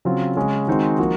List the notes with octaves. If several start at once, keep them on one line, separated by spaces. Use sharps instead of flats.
C#3 F#3 C4 F4
C#3 G#3 C#4
D#3 G#3 C4 D#4 F#4
F3 A#3 D#4 F#4